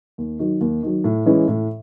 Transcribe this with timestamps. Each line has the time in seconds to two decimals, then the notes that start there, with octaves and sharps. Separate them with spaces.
0.18 D#2
0.39 D#3 F#3
0.61 D#2
0.83 D#3 F#3
1.04 A2
1.26 E3 G#3 C#4 E4
1.48 A2